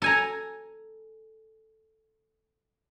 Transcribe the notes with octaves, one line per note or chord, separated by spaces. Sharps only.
A4 G#5 A#5